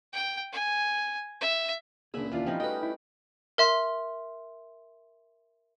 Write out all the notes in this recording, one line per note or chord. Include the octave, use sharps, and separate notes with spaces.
G5
G#5
E5
C#2 A#2 D4 G#4 E5 G#5 B5
D#2 E3 D4 F4 D5
F3 G3 C4 C#4 D#4
A3 F#4 B4 D#5 G5
E4
A#4 E5 C6